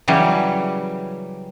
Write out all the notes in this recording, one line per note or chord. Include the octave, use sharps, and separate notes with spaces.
C#3 E3 F#3 G3